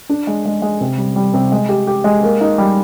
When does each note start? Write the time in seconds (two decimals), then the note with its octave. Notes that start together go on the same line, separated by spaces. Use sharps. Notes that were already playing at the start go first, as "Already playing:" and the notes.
0.09 D4
0.27 G#3
0.46 G#3
0.62 G#3
0.81 C3
0.98 G3
1.16 G3
1.34 C3
1.52 G#3
1.69 G4
1.87 G4
2.04 G#3
2.23 A#3
2.41 D#4
2.58 G3